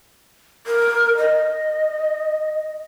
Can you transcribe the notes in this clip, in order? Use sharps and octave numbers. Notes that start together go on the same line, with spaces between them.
A#4
D#5